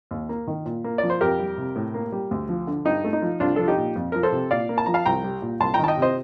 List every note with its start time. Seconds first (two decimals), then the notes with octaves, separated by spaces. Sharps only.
0.11 D#2
0.29 A#3
0.47 D#3
0.66 A#2
0.84 A#3
0.98 F3 D5
1.10 C5
1.21 F2 G4 A#4
1.39 G3
1.58 C3
1.76 A2
1.94 A#3
2.12 G3
2.31 D2
2.49 F3
2.67 D3
2.85 G2 D#4
3.04 A3
3.13 D#4
3.22 F3
3.40 C2 D4 F4
3.56 F3 A4
3.68 D#4 G4
3.77 A#2
3.96 F2
4.12 F3 A#4
4.23 A4 C5
4.32 C3
4.51 A#2 D5 F5
4.69 A#3
4.78 A5
4.86 F3 A#5
4.94 F5 A5
5.06 C2 G5 A#5
5.24 G3
5.42 A#2
5.60 C2 A5 C6
5.74 G5 A#5
5.79 D#3 A5
5.88 D#5 G5
5.97 C3
6.02 C5 D#5